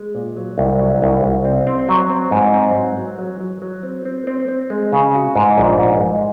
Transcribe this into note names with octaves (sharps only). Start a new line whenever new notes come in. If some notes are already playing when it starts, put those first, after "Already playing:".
Already playing: G#3
A#2
F#3
C2
F#3
C2
C2
C4
C4
F#3
C4
G#2
C4
F#3
F#3
F#3
F#3
F#3
C4
C4
C4
C4
G#3
C#3
F#4
G#2
A#1
G#2
G#2